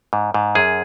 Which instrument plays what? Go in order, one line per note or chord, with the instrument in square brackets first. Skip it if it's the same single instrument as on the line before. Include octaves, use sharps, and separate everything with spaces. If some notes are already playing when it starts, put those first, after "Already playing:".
[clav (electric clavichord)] G#2
G#2
F#2 G#4